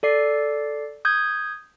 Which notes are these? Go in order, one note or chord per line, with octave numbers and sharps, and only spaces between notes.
A4 D5 C7
D#6 G6 G#6